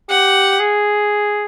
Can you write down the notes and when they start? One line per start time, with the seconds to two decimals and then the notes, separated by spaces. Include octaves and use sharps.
0.10 G4 F#5
0.59 G#4